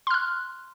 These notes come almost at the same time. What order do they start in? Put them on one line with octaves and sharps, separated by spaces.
C6 F6 F#6